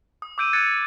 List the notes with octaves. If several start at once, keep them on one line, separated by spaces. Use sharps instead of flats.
D#6
D6 E6 G6 D7 D#7
F#6 G#6 A6 C#7 D#7